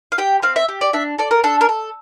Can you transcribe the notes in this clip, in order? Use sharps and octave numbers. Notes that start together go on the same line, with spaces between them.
F5
G4 G5
C4 F5
E5
G4
D5
D4 E5
A4 D5
A#4
D4 A4
A#4
A4